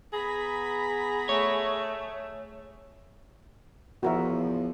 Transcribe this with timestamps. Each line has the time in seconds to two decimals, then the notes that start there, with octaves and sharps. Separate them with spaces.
0.13 B3 G#4 A#5 B5
1.29 A3 C#5
4.03 E2 F3 F#4 A#4 E5